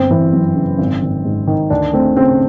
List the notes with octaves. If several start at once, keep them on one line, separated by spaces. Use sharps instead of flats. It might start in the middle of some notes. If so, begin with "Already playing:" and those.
Already playing: G1 C4
E3
F#2
C#3
G#1
G#1
G#2
D#3
D2 D4
A3 C4
C#3 C4